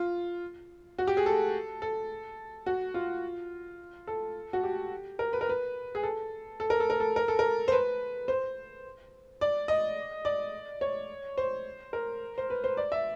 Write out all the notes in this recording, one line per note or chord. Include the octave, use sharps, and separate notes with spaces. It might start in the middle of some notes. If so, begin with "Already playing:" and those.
Already playing: F4
F#4
G4
G#4
A4
A4
F#4
F4
A4
F#4
G4
A#4
B4
A#4
B4
G#4
A4
A4
A#4
A4
A#4
A4
A#4
A4
A#4
C5
B4
C5
D5
D#5
D5
C#5
C5
A#4
C5
B4
C5
D5
E5